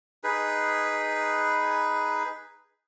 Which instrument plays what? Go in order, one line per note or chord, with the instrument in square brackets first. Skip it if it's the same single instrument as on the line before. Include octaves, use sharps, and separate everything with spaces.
[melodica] D#4 G#4 B4